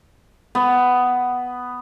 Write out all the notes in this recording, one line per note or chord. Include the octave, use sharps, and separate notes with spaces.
B3